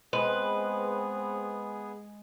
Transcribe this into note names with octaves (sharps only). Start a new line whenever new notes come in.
G#3 B3 C4 G#4 B4